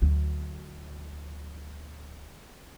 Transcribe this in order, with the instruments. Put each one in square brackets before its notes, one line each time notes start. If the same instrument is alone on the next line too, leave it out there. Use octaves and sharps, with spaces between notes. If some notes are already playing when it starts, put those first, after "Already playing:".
[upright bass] D2 F#3